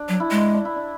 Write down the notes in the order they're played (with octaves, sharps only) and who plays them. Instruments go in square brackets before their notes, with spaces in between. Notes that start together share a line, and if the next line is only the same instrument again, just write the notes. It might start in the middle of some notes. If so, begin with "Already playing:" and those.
Already playing: [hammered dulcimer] D4
[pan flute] F#3
[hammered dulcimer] E4
[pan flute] G#3
[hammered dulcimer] D4
E4
D4